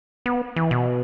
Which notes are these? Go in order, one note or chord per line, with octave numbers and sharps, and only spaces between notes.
B3
E3
B2